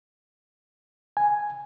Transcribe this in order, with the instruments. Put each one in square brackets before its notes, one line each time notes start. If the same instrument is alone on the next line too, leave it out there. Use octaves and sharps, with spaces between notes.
[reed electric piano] G#5